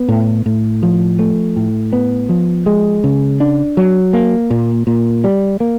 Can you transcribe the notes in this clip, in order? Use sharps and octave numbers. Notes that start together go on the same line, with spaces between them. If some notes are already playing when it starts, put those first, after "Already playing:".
Already playing: B3
A2
A2
F3
A3
A2
B3
F3
G#3
C#3
D4
F#3
A#3
A#2
A#2
G3
A#3